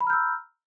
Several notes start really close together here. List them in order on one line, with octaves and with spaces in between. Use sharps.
B5 A#5 F6 G6 E6